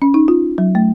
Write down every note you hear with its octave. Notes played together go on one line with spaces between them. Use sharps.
C#4
D#4
F4
F#3
A3